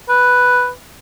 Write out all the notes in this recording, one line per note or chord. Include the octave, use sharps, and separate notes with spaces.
B4